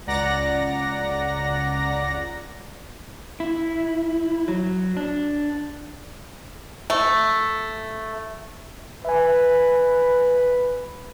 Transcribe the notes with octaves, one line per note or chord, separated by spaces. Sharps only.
C#2 D5 F#5 A#5 A#6
E4
F#3
D4
A3
B4 E5 G#5